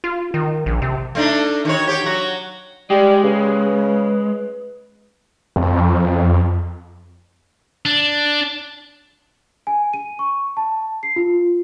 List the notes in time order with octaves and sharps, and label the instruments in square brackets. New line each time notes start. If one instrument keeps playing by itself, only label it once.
[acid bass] F4
D#3
A#1
C3
[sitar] A3 D4 D#4
D#3 F#4 C#5
G4 C#5
F#3 F#4
[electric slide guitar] G#3 [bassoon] G4 [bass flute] D5
[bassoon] C#3 [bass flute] B4
[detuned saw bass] F2
[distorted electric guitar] D4
[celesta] G#5
D#7
C#6
A5
C7
F4